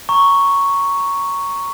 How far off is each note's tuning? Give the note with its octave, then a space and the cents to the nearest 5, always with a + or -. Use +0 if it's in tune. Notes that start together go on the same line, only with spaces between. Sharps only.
A#5 +0 C#6 +0